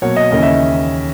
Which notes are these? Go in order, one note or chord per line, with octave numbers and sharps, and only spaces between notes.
B2 F#3 A#3 C#5
D#5
D#2 C#3 E3 A#3 C#4 D#5
E5